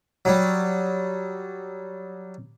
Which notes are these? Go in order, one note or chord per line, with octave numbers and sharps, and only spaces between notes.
F#3 G3